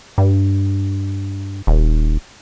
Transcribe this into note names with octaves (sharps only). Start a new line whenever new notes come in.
G2
D#1